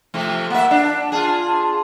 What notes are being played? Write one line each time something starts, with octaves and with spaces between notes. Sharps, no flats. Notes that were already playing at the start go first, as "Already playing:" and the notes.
C3 F3 A3
A#3 E5 F#5
D4
A5
F4 G#4 A5